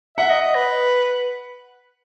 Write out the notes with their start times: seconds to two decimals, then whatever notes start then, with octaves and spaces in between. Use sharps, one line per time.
0.17 E5 F#5
0.30 D#5
0.42 D#5
0.55 B4